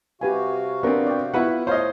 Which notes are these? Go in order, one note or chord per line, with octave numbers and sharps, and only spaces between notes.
C3 F#4 G4 B4 F5 G#5
B3 C4 D4 A#4
D5 G5
B3 E4 F4 B4 F#5
A2 F3 A3 C5 C#5 D#5 F5